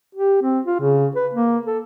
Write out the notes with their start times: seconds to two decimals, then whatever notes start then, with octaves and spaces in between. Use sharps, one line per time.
0.15 G4
0.42 C4
0.65 F4
0.80 C#3
1.15 B4
1.34 A#3
1.66 A4